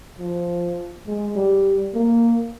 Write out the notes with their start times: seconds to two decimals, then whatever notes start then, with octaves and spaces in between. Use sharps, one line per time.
0.19 F3
1.07 G#3
1.36 G3
1.94 A#3